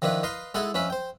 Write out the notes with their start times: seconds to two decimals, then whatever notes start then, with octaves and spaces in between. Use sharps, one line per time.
0.02 D#3 F3 D4 E4 B4
0.23 B4 D#5 F5 C6
0.54 G#3 D#4 E4 G#4 A4 F#5
0.74 F2 C#4 B4 E5 B5
0.90 C5 G5